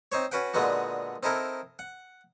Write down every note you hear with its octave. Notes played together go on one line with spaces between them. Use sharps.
C4 D#4 C5 C#5
C#4 F#4 B4 F#5 G5
A#2 D3 G#3 B3 D#4 F#4
C4 D#4 E4 A4 A#4
F#5